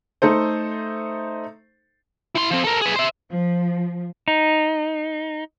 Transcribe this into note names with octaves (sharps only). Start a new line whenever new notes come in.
A3 D#4 A4 C5
E4 C6
F3 C4
A4 A#4
G#4 B4
C5 E5
F3
D#4